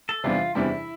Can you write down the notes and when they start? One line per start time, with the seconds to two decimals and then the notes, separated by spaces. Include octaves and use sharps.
0.09 A4
0.24 E2 C3 E3 G3 D4 F4
0.55 E2 C3 E3 G3 D4 E4